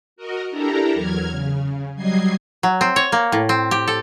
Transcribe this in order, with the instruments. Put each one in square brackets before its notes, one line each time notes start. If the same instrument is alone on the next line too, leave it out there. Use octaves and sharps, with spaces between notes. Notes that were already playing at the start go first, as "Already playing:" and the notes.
[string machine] F#4 A#4 D#5
D4 E4 G4 A4 A#4 A#5
E2 F#3 F6 G#6
C#3
F#3 G3 D#5 G#6 C7
[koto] F#3
C4
C#5
A#3
A2
C4
G4
A4